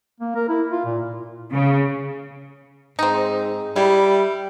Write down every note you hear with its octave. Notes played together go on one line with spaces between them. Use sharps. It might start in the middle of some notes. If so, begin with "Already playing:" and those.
A#3
A#4
E4
F4
A#2
C#3
G#2 C4 D#4
G3 E4